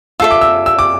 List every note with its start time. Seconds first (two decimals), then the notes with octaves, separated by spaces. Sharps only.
0.20 F4 A4 E5 E6
0.31 D6
0.41 E6
0.66 E6
0.79 D6